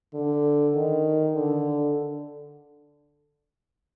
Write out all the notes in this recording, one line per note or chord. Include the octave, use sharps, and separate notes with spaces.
D3
D#3
D3